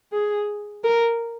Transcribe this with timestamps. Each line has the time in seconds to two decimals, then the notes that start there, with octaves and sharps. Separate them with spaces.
0.13 G#4
0.84 A#4